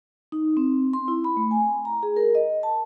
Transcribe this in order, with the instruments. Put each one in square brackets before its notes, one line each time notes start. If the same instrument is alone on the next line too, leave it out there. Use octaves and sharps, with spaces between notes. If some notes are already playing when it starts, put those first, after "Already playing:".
[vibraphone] D#4
C4
C6
E4
B5
A3
G#5
A#5
G#4
A#4
D#5
A5